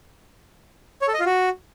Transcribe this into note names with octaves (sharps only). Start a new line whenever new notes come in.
C#5
A4
D#5
F4
F#4